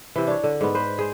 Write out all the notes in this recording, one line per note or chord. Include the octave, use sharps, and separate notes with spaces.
C3 E3
D4 C#5
D3
G#2 B3
B4 C5
G#4 C5